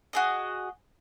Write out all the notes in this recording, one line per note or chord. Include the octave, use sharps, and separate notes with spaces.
F#4 G#4 D#5